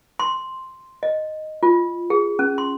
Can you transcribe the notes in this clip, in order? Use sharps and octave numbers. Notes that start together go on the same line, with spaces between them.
C6
D#5
F4
G#4
C#4
C6